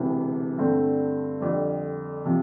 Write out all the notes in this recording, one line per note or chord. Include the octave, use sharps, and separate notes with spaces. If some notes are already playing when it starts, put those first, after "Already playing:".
Already playing: E1 D2 C3 E3
G2 D3 A3 C4
F2 D3 G3
C3 F3